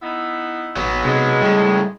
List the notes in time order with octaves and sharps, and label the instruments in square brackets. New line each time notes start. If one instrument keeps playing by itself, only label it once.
[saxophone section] B3 D#4 E4
[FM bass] A1 [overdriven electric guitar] F#3 B3
[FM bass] C3 [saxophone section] G#3
[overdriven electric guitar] A2 C#3 [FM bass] G3